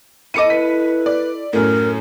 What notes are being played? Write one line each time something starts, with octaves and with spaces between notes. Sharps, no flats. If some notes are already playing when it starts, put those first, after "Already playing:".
E4 A4 D#5 D6 C#7 D#7
B4 B6
D5
F#2 A2 A#4